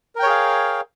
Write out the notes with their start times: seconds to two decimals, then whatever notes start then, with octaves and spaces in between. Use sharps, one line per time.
0.16 A#4
0.19 G5
0.23 C#5
0.26 G#4
0.30 F5